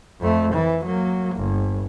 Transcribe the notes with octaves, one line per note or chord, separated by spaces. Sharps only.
F2 A3
E3
F#3 A#3
G1